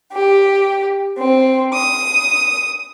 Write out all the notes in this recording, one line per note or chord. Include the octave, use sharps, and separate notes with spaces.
G4
C4
D#6